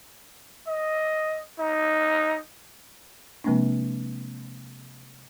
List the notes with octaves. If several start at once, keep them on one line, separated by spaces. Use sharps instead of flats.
D#5
D#4
C3 F3 G#3 A#3 C4 D4